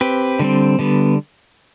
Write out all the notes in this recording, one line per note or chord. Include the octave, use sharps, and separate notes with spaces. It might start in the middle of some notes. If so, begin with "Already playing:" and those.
C4 G4 B4
D3 G3 C4
D3 G3 B3